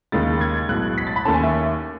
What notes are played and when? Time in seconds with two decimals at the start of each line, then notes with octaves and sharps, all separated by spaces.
0.12 D#2 C#3 G#3 A6
0.41 G#6
0.69 B1 A2 G#3 F#6
0.98 B6
1.07 A6
1.16 B5
1.25 D#2 D#3 A3 C#4 A5
1.34 G#5
1.43 E5